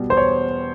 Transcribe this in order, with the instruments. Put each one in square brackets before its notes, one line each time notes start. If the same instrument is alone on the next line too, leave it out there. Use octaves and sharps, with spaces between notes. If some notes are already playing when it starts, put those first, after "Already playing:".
Already playing: [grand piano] B2 G3
E2 C5
C#5